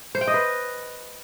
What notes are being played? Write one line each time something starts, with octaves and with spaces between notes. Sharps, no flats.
C5
G5
D#5
B4